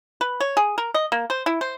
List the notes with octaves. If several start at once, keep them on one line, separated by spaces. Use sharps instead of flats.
B4
C#5
G#4
A#4
D#5
A#3
C5
E4
C5